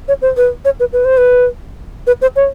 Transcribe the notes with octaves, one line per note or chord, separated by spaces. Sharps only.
C#5
C5
B4
C#5
B4
B4
C5
B4
B4
C5
C#5